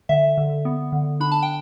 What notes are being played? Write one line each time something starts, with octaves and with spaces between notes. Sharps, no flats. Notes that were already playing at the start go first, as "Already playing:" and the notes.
D3 E5
D3
B3
D3
D4 B5
A5
G5